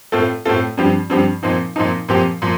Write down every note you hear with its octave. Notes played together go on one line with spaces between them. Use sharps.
A2 A3 C4 F4 A4
A2 A3 C4 F4 A4
G2 F3 C4 G4
G2 F3 C4 G4
A#2 F3 C4 D#4
A#2 F3 C4 D#4
A#2 F3 C4 G4
A#2 F3